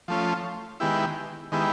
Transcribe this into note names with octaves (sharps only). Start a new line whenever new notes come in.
F3 A3 C#4 F4
D#3 G#3 B3 E4 G4
D#3 G#3 B3 E4 G4